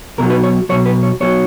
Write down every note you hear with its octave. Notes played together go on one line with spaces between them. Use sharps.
B1 B2 F#3 A#4
B4
C#5
B1 B2 F#3 C#5
B4
C#5
B1 B2 F#3 C#5